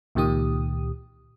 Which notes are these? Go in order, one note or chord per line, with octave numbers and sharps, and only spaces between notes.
C#2 A#2 D#3 G4 D#6